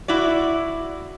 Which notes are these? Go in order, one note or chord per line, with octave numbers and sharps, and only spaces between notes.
E4 F#4 D5